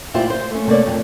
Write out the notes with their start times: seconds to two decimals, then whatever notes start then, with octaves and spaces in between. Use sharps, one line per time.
0.14 D2 A#2 E4 F4 G4 C5
0.30 C5
0.51 A3 C#4
0.67 C3 A3 A#3 C#5 D5
0.86 F2 A#2 C#4 D4